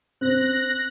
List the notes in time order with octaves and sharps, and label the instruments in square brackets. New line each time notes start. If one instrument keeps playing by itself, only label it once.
[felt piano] C4 [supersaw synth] F#6 A#6